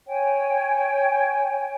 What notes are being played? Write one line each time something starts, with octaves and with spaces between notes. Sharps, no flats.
C#5 G5 G#5